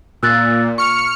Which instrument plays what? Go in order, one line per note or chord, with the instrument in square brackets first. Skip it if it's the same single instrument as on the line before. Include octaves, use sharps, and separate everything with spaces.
[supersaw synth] A#2 [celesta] E6 F#6 A6
[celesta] C#6 [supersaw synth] F6 C#7